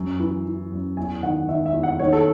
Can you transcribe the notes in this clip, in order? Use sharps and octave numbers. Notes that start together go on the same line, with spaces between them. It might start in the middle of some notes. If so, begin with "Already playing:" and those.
Already playing: F#2
E3
E3
F#2
E2 G#5
D#3 F#5
D#3 E5
E5
E2
F#5
D#3 C#5
A4